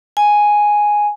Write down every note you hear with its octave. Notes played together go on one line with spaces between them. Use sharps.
G#5